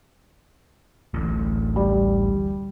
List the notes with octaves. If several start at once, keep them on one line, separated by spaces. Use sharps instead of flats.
D1 A1
G3